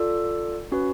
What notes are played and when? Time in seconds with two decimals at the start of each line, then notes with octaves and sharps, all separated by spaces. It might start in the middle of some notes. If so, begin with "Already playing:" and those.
Already playing: F4 A4 D5
0.72 C#4 F#4 B4